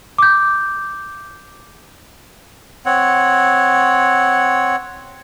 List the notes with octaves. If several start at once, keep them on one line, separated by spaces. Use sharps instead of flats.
D6 G6
C4 C#5 F#5